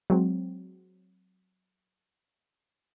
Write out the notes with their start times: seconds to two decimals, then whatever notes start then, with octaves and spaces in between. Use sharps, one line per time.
0.10 F#3 G#3 C4